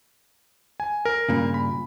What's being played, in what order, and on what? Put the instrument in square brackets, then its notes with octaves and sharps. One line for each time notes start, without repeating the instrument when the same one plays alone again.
[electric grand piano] G#5
A#4
[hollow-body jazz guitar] G2 A#2 C#3
[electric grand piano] B5